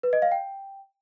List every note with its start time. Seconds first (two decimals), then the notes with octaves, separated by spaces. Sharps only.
0.03 B4
0.13 D#5
0.22 F5
0.32 G5